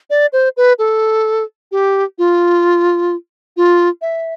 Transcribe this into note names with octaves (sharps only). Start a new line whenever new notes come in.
D5
C5
B4
A4
G4
F4
F4
E5